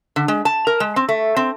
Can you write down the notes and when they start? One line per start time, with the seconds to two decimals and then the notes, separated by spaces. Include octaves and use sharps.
0.16 D3
0.28 G#3
0.45 A5
0.67 A#4
0.80 G#3
0.96 C4
1.09 A3
1.36 C4